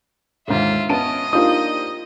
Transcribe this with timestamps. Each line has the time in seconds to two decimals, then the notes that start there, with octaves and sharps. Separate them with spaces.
0.48 D#2 G#2 D3 F4 E5
0.89 B3 C#4 D#5 A5 D7 D#7
1.33 A#3 D4 D#4 F4 G4 C5 D#6